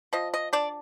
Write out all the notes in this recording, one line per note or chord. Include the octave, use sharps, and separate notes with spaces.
F3 D#5
D#5
D4 D5